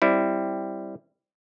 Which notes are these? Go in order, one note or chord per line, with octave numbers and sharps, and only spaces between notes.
G3 C4 E4